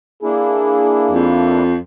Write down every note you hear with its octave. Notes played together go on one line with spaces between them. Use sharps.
A#3 D4 E4 G#4
F2